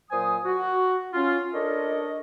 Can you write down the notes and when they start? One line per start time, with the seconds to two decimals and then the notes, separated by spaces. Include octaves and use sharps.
0.11 A#2 F#3 C5 G#5 D#6
0.45 F#4
1.14 C#4 F4
1.53 D4 A4 A#4 C#5 D#5